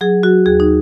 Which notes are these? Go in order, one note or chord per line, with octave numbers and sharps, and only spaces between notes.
F#3 G#4
F#3 F#4
D#2 G#4
D#4